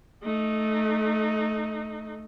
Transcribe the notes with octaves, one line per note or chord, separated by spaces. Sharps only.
A3 D#4